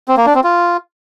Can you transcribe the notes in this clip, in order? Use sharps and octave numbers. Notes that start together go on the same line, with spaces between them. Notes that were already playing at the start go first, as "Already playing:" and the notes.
C4
A#3
D4
C4
F4